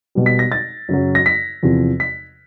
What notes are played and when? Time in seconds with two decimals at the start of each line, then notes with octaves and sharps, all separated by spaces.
0.15 B2 G3
0.26 B6
0.39 A#6
0.52 A6
0.89 F#2 C#3 F#3
1.15 A#6
1.26 B6
1.63 E2 C3 F3
2.00 B6